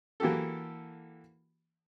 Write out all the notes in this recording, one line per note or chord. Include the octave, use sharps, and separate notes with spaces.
E3 A#3 F#4 G4 A4